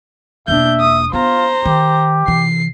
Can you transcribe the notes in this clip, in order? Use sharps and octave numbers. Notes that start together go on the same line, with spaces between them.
E1 A#3 D4 E5 G6
D#6
B3 F4 C5 A#5
D#3 G4
C3 E3 C7